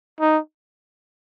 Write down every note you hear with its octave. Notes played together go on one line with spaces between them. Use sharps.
D#4